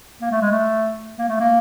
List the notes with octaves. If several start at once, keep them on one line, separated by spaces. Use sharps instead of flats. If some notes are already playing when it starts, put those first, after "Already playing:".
A#3
A3
G#3
A3
A#3
A3
A#3